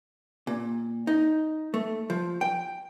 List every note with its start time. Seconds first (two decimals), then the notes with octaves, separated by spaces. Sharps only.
0.47 A#2
1.07 D#4
1.74 A3
2.10 F3
2.41 G5